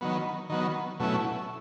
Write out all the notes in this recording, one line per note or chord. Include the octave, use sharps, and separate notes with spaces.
D#3 F#3 B3
D#3 F#3 B3
B2 F#3 A3 C#4 E4